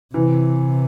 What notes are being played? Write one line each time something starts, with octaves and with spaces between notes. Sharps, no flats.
C3 E3